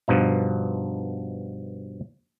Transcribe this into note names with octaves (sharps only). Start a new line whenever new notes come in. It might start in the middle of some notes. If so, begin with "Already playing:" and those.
G2 B2 F3 D#4